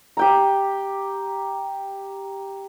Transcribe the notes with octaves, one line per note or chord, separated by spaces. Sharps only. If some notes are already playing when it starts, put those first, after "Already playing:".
G4 G5 A#5